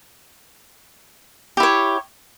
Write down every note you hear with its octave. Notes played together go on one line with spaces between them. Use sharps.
E4 G4 C#5